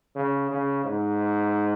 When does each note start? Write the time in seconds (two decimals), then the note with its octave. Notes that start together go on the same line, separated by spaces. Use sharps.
0.16 C#3
0.50 C#3
0.84 G#2